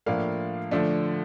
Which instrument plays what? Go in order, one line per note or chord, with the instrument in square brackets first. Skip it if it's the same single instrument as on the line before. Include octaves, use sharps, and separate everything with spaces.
[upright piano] A2 F3 A#3 D4 F5
D3 F3 A3 D4